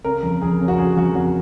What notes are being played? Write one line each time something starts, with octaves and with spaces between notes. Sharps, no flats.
C#3 A#4
F2
F2 G#4
C#3
F#4
F2 G#4
F2 F#4
F2 F#4